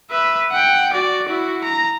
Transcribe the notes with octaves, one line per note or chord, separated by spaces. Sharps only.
B4 E5
F#5 G5
F#4 D5
E4 F#4
A#5